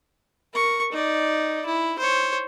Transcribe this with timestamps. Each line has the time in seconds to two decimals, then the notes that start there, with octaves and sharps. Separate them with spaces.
0.53 A#4 C#6
0.92 D#4 D5
1.66 E4
1.99 C5 C#5